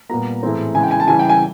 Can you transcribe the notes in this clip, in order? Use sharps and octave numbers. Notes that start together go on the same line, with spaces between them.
A#2 G3 B3 A#5
A2 E3 G#3 C4
C#3 E3 G#3 G#5
G5
G#5
A5
C#3 E3 G3 G#5
G5
G#5